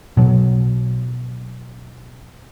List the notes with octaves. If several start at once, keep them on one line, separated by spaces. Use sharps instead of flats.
B2 F#3